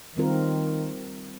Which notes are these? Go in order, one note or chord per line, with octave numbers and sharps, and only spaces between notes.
D#3 G3 C4 F4 A#4